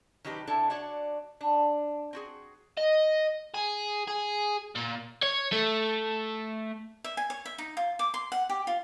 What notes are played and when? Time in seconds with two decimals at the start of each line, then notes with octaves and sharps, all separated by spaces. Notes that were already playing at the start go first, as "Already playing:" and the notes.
0.25 D#3 F#3 D#4 G4 B4
0.47 C3 D4 E4 A4 E5
0.70 D4 F#4 C#5 D5
1.41 D4
2.13 C4 F#4 G#4
2.78 D#5
3.54 G#4
4.07 G#4
4.76 A#2
5.23 C#5
5.53 A3
7.04 E5
7.17 G#5
7.30 C#5
7.45 E5
7.58 D#4
7.77 F4
7.99 D6
8.14 C6
8.32 F#5
8.49 G4
8.67 F4